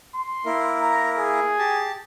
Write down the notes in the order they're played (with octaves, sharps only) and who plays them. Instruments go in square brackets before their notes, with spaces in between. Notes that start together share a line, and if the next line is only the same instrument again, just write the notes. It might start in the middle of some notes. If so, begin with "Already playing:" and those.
[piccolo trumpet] C6
[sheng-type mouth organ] A#3 E4 A#4
[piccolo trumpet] A#5
G#4
[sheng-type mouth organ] G4 A5